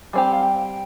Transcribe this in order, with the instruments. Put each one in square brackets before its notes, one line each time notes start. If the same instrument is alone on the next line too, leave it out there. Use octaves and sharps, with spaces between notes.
[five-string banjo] G3 C4 G4 [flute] G#5
[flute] G5
F5
G5